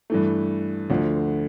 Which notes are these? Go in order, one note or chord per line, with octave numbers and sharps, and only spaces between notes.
G2 E3 A3
D2 D3 F3